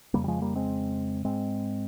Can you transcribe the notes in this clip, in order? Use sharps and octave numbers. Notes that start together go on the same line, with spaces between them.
F2 C#3 G3 A#3
G3
F3 G#3
G3 A#3
G#3 C4
G#2 G#3 C4